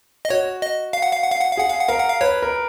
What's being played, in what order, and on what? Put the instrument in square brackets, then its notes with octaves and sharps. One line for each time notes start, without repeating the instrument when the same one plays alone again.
[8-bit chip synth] D#5
[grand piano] F#4 [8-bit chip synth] C#5
[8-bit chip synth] D#5
F5
F#5
F5
F#5
F5
F#5
F5
[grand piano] G#4 [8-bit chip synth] F#5
[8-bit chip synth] F5
F#5
[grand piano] A#4 [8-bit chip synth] F5
[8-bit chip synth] F#5
F5
[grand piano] B4 [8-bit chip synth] C#5
[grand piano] A#4